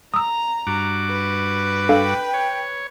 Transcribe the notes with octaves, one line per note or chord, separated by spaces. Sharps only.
A#5 D#6 E6
G2 F#4 D6
B4
D4 A4 F5 G5
C#5